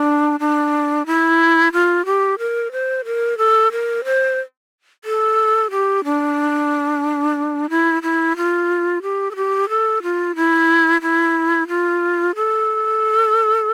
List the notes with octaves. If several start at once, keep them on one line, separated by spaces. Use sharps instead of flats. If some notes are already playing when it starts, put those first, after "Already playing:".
Already playing: D4
D4
E4
F4
G4
A#4
C5
A#4
A4
A#4
C5
A4
G4
D4
E4
E4
F4
G4
A4
G4
A4
F4
E4
E4
F4
A4